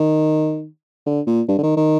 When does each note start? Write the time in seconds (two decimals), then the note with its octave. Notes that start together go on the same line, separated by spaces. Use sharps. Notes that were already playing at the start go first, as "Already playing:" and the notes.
Already playing: D#3
1.06 D3
1.27 A#2
1.48 G2
1.58 D3
1.63 D#3
1.77 D#3